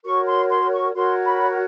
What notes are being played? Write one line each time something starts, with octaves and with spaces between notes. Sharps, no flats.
F#4 A#4 C#5 C#6
C6
C6
C#6
F#4 A#4 C#5 C6
B5